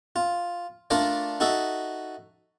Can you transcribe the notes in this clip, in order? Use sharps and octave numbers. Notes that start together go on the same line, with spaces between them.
F4
A3 D4 F4 A#4 D5
D#4 F#4 A4 E5